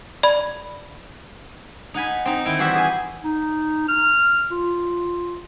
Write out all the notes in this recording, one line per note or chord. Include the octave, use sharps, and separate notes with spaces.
D5 B5
D#4 F#5 G#5 B5
C4 D#4
D#3 E4 G5
E3 G3 F#4 C5 E5
G#4 G#5
D#4
F6
F4